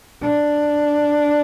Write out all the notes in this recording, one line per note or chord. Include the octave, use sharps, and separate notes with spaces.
D4